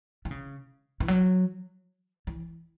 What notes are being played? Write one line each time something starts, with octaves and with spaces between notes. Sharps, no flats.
E3
C#3
E3
F#3
E3